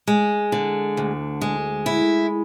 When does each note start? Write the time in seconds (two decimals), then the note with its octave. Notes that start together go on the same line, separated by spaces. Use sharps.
0.07 G#3
0.52 D3
0.97 D2
1.41 G#3
1.86 E4